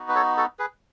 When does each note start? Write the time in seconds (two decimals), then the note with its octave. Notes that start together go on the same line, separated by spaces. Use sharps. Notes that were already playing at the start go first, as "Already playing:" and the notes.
Already playing: B3 D#4 F#4
0.09 B4
0.15 A4 C#5
0.37 F#4 A4
0.59 G#4 B4